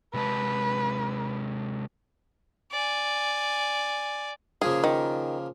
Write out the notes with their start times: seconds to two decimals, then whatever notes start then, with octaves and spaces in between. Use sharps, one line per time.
0.14 C3 G#3 B4 A5
2.71 D5 G#5
4.62 C#3 F3 A#3 G#4
4.84 D#3